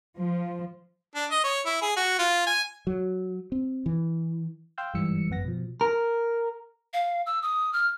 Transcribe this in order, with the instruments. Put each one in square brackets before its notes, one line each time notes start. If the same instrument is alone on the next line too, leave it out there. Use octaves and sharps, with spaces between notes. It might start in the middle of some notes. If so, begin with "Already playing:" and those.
[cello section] F3
[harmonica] D4
D#5
C#5
E4
G#4
F#4
F4
G#5
[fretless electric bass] F#3
C4
E3
[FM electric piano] F5 G5 C6 E6 F6 G6
G1 G#2 E3 G3 E6 C#7
G#1 F#2 B3 F#5 A#6
B2 F3
[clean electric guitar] A#4
[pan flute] F5
E6
D#6
F6